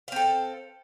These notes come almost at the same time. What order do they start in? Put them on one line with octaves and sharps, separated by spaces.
F5 C4 A4